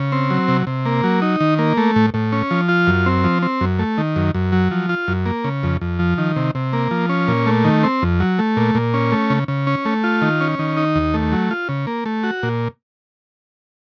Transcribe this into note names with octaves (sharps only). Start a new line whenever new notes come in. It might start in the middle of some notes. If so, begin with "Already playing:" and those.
Already playing: C#3
C4
F#3
C3
C3
A#3
F#3
D#4
D#3
A#3
A3
A2
A2
C#4
F3
F4
F#2
C4
F3
C4
F#2
A3
D#3
F#2
F#2
F#3
F3
F4
F#2
A#3
C#3
F2
F2
F3
D#3
C3
C3
A#3
F3
C#4
A#2
A3
D#3
C4
F2
F#3
A3
A#2
A#2
C#4
A3
C#3
C#3
C#4
A3
F4
D#3
C#4
D#3
D#4
D#2
A3
F#3
F4
C#3
A#3
A3
F#4
A#2